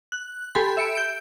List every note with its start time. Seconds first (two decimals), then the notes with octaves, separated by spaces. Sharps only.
0.12 F#6
0.55 G4 A4 G#5 B5 C6
0.77 E5 C#7 D7
0.95 G6 D7